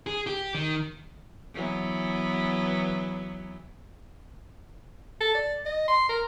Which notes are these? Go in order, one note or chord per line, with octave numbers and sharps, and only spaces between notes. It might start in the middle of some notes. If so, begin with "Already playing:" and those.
G#4
G4
D#3
E3 F#3 B3
A4
D5
D#5
C6
A#4